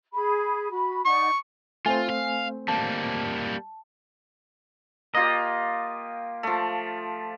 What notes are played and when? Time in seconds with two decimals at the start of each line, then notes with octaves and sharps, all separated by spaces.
0.13 G#4 B5
0.71 F#4 B5
1.05 D#4 D5 F#5 C#6
1.86 A3 C4 F4 C5 G#5
2.10 F5
2.68 G3 A#3 A5
5.15 A#3 F4 G4 D#5
6.43 F3 A3